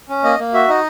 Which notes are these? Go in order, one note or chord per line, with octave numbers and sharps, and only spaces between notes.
C#4
A#3 D#5
A#3
F#4 E5
D#4 D#5